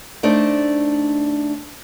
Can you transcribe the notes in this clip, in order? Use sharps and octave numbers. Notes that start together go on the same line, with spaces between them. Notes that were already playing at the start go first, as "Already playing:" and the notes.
A3 D4 D#4 C5 D5